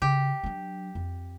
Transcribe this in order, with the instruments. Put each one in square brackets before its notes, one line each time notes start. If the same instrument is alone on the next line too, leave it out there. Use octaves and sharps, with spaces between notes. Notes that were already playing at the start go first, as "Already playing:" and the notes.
[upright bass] C#3 [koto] G4
[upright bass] F#3 D4
F2